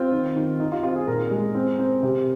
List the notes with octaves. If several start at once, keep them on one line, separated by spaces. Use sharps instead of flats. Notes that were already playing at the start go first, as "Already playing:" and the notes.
Already playing: C4 F4
D#3
D#3
D#3 D#4
F4
C4 F4
G#4
A#2 A#4
G#3
C4
C4
C3